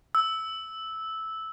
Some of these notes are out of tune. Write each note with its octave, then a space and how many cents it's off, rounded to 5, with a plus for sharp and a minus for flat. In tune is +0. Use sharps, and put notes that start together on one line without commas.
E6 -10